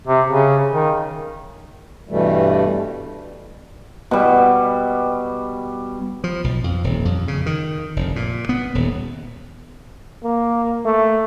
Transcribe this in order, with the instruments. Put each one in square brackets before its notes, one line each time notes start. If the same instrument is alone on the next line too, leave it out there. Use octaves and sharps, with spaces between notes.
[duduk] C3
C#3
D#3
[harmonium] G2 B2 E3 G3 A3
[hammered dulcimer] B2 G3
[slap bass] F3
B1
F2
D#1
F2
C#3
D#3
F1
A#2
B3
D#1
[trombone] A#3
A3